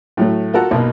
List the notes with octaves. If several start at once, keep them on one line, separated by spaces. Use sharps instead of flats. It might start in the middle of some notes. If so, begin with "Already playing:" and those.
A2 F#3 A3
F4 F#4 A4 A#4 F#5
B1 B2 A#3